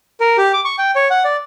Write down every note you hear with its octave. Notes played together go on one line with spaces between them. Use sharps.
A#4
G4
D6
C#6
G5
C#5
F#5
D5